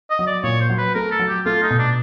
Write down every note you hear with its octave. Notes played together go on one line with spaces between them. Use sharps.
D#5
F#3
D5
A#2 C#5
C5
F#3
B4
A3 A#4
A4
F#3
G4
A3 F4
D#4
B2
D4